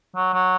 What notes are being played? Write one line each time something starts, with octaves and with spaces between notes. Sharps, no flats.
F#3
F#3